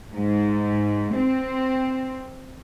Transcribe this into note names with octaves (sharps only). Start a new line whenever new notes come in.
G#2
C4